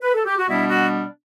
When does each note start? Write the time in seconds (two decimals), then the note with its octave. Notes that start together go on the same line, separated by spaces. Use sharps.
0.02 B4
0.14 A4
0.26 G4
0.37 F#4
0.48 B2 G3 B3 D4 E4
0.68 F#4